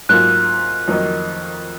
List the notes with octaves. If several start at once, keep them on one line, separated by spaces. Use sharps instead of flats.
G#2 F#3 A#3 F4 F#6
F2 D#3 F#3 A#3 D#4